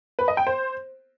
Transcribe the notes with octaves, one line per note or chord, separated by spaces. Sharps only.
B4
D#5
G5
C5